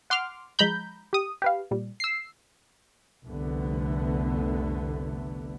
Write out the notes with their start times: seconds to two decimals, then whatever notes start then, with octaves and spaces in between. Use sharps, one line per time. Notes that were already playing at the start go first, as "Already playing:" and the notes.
0.10 F#5 C6 D6 F6
0.59 F3 G#3 A#5 B5 G6
1.13 G4 D#6
1.42 G4 B4 F5
1.71 A#2 G3
2.00 E6 C7
3.24 F1 C2 D3 A3 B3